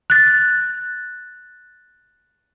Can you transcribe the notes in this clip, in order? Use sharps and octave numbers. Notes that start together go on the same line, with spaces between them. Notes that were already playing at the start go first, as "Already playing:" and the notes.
F#6 A6